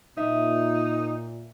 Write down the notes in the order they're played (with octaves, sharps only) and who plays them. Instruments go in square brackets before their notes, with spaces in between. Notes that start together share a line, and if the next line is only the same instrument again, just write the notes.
[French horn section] A#2 [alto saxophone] D#4 [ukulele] E5